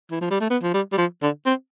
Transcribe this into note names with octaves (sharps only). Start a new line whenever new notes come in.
E3
F3
G3
A3
B3
F3
G3
G3
F3
D3
C4